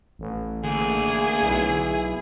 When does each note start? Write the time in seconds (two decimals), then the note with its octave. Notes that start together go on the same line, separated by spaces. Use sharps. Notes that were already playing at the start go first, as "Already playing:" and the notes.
0.19 A1
0.63 D2 A#3 G#4
1.43 B1 E4